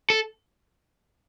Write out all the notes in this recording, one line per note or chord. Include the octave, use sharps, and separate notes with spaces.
A4